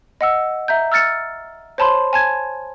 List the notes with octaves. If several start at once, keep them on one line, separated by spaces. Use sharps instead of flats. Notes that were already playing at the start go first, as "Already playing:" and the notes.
D#5 F#5 E6
E5 A#5 G6
E6 F6 A6 C#7
C5 C#5 A5 B5 C6
G#5 A5 G#6